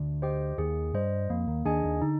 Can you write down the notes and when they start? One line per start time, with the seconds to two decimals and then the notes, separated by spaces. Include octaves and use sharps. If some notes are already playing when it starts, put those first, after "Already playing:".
Already playing: D2 D3
0.22 G4 C5 D#5 G5
0.58 D#2 D#3 G#4
0.94 G2 G3 C5 D#5
1.30 F2 F3 A#3
1.47 D#2 D#3
1.65 D#2 D#3 D4 G#4 D#5 G#5
1.84 D#2 D#3
2.02 D3 D#4